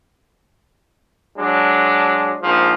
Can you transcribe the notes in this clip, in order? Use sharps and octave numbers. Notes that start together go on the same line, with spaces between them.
F#3 G#3 D4
A#1 G#2 F3